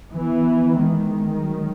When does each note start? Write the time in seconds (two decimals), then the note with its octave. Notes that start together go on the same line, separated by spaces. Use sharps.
0.13 E3 B3
0.77 D#3 G#3
1.41 F#3